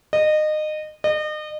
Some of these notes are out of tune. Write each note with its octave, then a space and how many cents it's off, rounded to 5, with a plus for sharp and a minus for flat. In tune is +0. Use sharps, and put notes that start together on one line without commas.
D#5 -25
D#5 -35